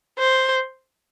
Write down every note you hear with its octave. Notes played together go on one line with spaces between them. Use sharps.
C5